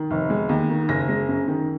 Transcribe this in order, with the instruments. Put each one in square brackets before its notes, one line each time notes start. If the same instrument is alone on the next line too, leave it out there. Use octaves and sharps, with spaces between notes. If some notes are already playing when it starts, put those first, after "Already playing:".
Already playing: [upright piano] D#3
F1
G#3
D#2
D#3
F#1 A#6
G#3
F#2
D#3